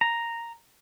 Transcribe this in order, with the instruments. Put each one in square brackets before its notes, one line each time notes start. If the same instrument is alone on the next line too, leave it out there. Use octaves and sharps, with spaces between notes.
[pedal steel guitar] A#5